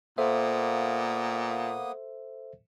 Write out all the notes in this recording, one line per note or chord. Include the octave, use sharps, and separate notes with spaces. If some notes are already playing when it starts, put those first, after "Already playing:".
A#2 A#3 B3 A4 C5 E5 D#6